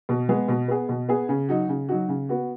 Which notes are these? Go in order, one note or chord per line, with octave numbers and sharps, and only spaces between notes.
B2
G#3 B3 G#4
B2
B3 G#4
B2
B3 G#4
C#3
F#3 D#4 F#4
C#3
F#3 D#4 F#4
C#3
B3 F#4